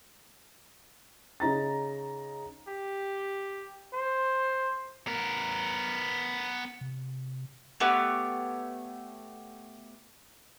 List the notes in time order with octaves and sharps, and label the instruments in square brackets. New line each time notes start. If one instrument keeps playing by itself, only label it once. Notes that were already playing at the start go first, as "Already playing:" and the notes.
[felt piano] C#3 D#4 A#5 A6
[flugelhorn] G4
C5
[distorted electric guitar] B3 A#4
[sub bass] C3
[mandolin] A3 B3 G4 C#5